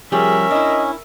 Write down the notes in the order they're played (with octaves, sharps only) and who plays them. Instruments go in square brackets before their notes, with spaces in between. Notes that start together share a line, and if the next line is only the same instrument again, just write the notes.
[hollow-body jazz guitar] F3 G3 G4 [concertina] C#4 [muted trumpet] G#4 [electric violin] A#4 E5
[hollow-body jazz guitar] D4 E4 [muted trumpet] D#5